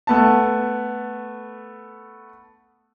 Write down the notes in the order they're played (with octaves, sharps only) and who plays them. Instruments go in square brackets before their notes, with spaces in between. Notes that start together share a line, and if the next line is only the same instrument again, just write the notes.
[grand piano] A3 B3 A5